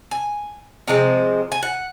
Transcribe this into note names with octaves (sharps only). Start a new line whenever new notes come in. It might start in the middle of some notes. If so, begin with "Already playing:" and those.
G#5
C3 F3 G#3 C4
G#5
F#5